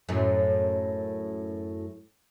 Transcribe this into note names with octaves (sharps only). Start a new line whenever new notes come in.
F#2 A2